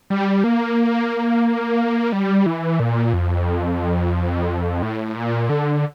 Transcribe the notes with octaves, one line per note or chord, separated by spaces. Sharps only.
G3
A#3
G3
E3
A#2
F2
A2
A#2
D3